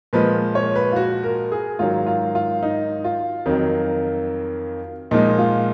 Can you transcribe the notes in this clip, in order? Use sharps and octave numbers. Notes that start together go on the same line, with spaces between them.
A#2 F3 G#3 B4
C#5
B4
F4
F#4
A#4
G#4
G#2 D#3 F#3 F4
F4
F4
D#4
F4
F2 D#3 F#3
A#2 F3 G#3 D#4
F4